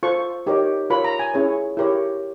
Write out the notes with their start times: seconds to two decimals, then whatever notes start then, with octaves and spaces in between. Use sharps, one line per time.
0.03 F4 A4 C5 C#6
0.46 D#4 G4 A#4 C#5
0.90 F4 A#4 C#5 B5
1.04 A#5
1.19 G#5
1.34 C#4 E4 G#4 C#5
1.77 E4 G4 A#4 C#5